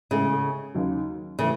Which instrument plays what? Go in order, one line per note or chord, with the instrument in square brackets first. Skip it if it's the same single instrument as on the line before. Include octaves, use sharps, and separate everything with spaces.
[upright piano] A1 A2 G#3 [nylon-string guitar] C#3
[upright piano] D#2 C#3 F#3
[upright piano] A2 E3 A3 [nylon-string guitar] C#3